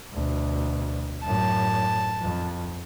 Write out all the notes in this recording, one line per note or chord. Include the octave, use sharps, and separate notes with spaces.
D2 B2
F#2 A2 A5
F2